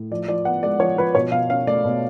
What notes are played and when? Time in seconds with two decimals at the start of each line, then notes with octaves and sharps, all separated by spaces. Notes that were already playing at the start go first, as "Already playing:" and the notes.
Already playing: A2
0.11 F3 D5
0.28 F3 D5
0.45 B3 F#5
0.63 G#3 D5
0.80 F3 C#5
0.97 F3 B4
1.15 B2 C#5
1.32 B2 F5
1.50 C#4 F5
1.67 A3 D5
1.84 B2